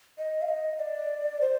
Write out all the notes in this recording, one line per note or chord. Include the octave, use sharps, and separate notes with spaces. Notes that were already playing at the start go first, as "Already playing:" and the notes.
D#5
F5
D#5
D5
C5